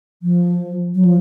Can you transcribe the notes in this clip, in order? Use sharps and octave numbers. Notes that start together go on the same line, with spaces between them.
F3
F#3
F3